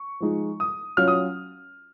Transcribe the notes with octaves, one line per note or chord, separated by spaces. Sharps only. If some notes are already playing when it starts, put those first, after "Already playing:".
Already playing: C#6
F3 G#3 D#4
D#6
F#3 C#4 F4 F6
D#6